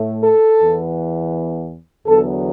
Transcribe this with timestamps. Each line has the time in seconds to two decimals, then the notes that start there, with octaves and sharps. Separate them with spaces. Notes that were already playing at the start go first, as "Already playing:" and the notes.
Already playing: A2 A3
0.24 A4
0.61 E2 E3 B3
2.06 E2 D3 F#3 B3 A4